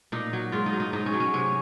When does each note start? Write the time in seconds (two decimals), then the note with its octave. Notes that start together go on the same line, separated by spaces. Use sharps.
0.12 A#2 D#4
0.33 F#3
0.52 G#2 F4
0.66 D#4
0.73 F#3
0.80 D#4
0.93 G#2 D#4
1.06 C#4
1.14 F#3
1.20 C#4
1.33 C3 C#4